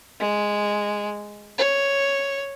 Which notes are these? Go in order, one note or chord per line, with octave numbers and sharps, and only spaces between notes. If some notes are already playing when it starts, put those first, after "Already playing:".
G#3
C#5